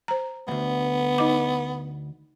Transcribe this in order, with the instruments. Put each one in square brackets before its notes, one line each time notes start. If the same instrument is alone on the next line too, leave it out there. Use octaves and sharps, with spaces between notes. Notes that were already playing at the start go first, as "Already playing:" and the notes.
[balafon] C5 A#5
[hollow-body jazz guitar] D2 G2 [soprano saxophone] B3
[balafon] D#4 D#5 D6